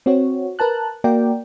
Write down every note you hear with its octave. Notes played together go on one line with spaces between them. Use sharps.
C4 F#4 C#5
A#4 B4 A5 F#6
A#3 F#4 A#4 D5 G5